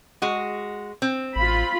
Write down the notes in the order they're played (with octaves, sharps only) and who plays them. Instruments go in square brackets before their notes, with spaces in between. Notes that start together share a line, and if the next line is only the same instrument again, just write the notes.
[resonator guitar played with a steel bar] G#3 F#4
C4
[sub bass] A1 [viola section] F4 B5